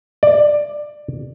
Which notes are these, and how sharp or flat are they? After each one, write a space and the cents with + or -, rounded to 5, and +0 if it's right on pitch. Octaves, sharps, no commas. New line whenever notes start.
D5 +15